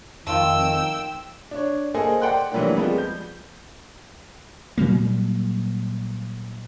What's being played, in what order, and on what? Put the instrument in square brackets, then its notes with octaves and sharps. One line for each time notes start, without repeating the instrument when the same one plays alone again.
[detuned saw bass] F2 [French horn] D#3 [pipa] A3 F4 [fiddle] G5 E6
[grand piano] D4 C#5
A#3 G#4 A4 C5 D#5 G#5
D5 F#5 G5 C6 F#6
E3 F#3 G3 A3 A#3 D4
F3 G3 G#3 B3 C4
G6
[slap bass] A#2 F#3 G3 A#3